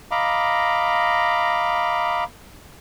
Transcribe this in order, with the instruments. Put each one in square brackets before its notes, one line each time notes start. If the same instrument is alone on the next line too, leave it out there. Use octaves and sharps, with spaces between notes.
[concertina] D#5 F5 A#5 B5 D6